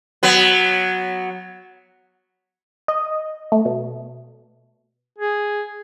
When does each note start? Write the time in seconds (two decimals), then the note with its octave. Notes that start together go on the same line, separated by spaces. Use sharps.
0.23 F#3 B3
2.88 D#5
3.52 A3
3.65 B2
5.19 G#4